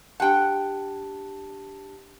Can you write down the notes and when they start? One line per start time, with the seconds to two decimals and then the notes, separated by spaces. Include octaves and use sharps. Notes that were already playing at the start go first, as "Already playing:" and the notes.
0.20 D4 G4 F#5 G5 A5